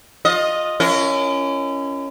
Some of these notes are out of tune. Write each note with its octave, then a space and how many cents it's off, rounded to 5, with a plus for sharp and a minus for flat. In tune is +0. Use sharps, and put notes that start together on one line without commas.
F4 +20 D#5 +0
C#4 +0 E4 +45 A#4 -15